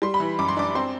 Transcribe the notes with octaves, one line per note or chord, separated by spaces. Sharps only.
G3 C6
B5
E3
F#2 D6
C6
D4 D6
C4 C6